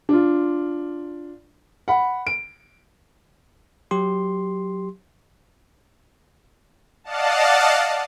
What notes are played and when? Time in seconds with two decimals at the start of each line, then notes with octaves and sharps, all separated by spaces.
0.09 D4 F4
1.88 F#5 B5
2.27 D7
3.91 F#3 G4 C6
7.04 D5 D#5 F5 F#5 A5